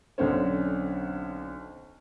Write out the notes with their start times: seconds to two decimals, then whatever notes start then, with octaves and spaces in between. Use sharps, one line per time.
0.18 B1 D3 C4 C#4